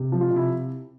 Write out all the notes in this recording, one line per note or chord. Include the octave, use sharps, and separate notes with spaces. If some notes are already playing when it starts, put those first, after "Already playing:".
Already playing: C3
F3
F4
C3
E4